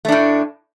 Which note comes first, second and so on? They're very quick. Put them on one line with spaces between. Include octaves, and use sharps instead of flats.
A3 D4 A2